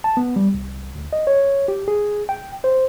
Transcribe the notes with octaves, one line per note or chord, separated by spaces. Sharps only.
A5
B3
G3
C2
D2
D#5
C#5
G4
G#4
G5
C5